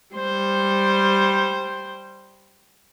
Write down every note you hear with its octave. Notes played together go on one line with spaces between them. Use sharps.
G3 C5